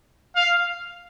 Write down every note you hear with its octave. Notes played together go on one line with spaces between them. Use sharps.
F5